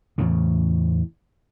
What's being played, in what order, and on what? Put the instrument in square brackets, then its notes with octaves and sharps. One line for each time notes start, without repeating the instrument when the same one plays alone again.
[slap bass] E2 A2 C#3